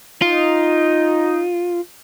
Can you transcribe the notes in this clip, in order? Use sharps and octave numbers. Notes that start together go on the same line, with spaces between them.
D#4 F4